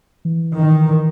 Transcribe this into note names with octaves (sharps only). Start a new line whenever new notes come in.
E3
D#3